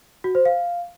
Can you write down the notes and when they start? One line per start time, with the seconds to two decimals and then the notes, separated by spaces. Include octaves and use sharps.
0.24 F#4
0.35 C5
0.45 F5